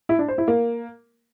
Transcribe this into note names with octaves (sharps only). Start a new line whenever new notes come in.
E4
D4
C5
E4
A#3